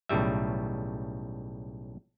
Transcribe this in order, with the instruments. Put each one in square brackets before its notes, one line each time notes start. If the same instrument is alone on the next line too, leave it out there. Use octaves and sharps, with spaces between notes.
[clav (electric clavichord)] B1 A2 C#3 G3 E5